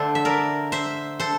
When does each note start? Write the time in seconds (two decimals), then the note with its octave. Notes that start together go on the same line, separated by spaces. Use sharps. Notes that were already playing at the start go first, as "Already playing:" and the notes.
Already playing: D3 A3 D4 A4 C5
0.15 E5
0.25 A#4 D5
0.72 C5 E5
1.19 A4 C5